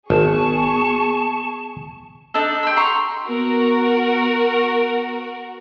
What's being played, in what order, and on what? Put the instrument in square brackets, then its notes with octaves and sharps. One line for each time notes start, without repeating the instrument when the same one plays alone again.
[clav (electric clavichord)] G#1 [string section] B3 G#4 C#6 [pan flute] A5
[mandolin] D4 D#4 A4
G4 C6 E6
A#5 C6 C#6
[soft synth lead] B3 [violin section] F#4 A#4